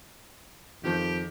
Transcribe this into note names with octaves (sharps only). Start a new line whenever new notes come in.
F2 D#3 F3 G4 G6